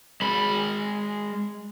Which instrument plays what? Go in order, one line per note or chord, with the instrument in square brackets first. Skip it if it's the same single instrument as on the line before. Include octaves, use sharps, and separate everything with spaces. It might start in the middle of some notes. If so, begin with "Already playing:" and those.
[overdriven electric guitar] G#3 B5